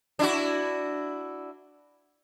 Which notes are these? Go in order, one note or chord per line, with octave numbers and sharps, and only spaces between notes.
D4 E4 F#4